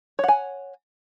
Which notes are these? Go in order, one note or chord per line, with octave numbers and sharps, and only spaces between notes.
C#5 F#5 G#5